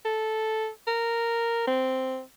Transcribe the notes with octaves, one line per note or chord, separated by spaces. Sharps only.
A4
A#4
C4